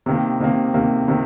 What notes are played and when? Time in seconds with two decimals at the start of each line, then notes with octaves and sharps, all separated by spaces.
0.06 C3 D#3 A#3
0.40 C3 D#3 A#3
0.74 C3 D#3 A#3
1.08 C3 D#3